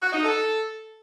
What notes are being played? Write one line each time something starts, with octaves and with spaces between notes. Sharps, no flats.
F#4
D#4
A4